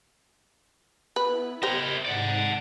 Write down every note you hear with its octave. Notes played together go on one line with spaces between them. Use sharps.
B3 E4 B4
E4 G4 A#4 C5 D#5
G#2 C3 D#4 D5 F#5